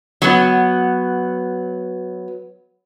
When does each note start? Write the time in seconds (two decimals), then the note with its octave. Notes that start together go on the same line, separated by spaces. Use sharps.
0.22 F#3 B3